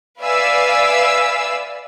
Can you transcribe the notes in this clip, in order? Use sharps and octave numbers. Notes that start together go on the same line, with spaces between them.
B4 D5 E5 F5 G#5 E6